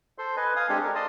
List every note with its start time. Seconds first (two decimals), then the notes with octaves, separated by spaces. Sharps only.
0.18 A4 C5 C6
0.37 B4 D#5 G#5
0.56 F5 G#5 D#6
0.69 G#3 C4 D4 G4 A4
0.83 A#4
0.95 D5 D#5 A5 C6 D#6